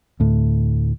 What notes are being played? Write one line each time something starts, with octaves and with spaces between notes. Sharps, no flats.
D2 A2